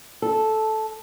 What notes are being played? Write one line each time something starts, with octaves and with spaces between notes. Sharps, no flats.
A4